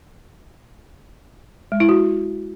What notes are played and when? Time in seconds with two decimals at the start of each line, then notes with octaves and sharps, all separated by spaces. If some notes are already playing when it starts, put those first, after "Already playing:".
1.72 G#3
1.80 E4
1.89 F#4